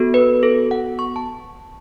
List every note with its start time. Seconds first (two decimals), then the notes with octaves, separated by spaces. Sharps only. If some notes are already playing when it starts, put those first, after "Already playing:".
Already playing: B3 F#4 A4
0.14 B4
0.43 A4
0.71 F#5
0.99 C#6
1.16 A5